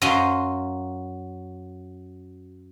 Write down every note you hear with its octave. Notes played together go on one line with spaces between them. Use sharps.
F#2 F#3 F#4 D#5 F5 C6